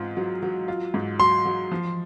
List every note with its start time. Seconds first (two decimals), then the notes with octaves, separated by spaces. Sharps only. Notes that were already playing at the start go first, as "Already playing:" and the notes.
Already playing: G#2 C4 F4
0.17 F#3
0.43 F#3
0.68 F4
0.94 G#2
1.20 F#3 C6
1.45 F#3
1.72 F3